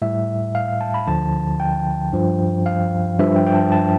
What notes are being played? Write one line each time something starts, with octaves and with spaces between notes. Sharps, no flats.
A2 G3 E5
F5
F5
A5
B5
D2 D3 F3 A5
G5
G2 F3
F5
G2 F3 E5
G5
G5
A5
A5